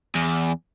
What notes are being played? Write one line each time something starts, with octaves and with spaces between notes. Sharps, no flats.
E2